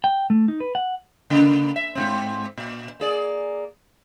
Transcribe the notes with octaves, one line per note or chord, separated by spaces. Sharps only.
G5
A3
D#4
B4
F#5
C#3 A#3
E5
G#2 B2 C4
A#2
A#3 G#4 D5